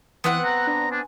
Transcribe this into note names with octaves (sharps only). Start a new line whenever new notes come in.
E3 B3 C4 F#5
A#5 F#6
D4
D4 G#5